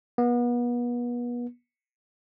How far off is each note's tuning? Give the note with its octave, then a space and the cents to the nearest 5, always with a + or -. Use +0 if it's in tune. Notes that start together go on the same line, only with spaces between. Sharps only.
B3 -35